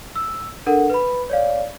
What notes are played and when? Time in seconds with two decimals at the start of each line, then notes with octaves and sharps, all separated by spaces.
0.16 E6
0.66 D4 A4 A#4 F#5
0.90 B4 B5
1.30 C#5 D5 F5